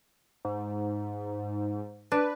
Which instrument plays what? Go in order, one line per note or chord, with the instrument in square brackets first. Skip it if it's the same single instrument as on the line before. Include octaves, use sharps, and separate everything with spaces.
[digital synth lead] G#2
[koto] D4 [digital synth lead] B4